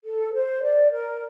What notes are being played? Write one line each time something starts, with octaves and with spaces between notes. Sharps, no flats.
A4
C5
D5
A#4